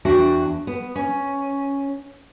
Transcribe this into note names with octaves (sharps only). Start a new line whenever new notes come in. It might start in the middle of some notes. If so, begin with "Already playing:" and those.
E2 D4 F#4 E5 G5
B3
C#4